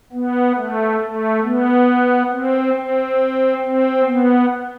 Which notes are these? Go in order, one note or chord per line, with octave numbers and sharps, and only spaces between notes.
B3
A3
A3
B3
C4
C4
C4
B3